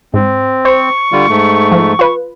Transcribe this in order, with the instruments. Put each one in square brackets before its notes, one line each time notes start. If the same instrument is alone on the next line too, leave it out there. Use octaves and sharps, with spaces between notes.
[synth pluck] G#2 [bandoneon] C4
[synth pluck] C5 [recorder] C#6
[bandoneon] D3 G3 F4
G#2 A3
[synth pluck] F3
F4 B4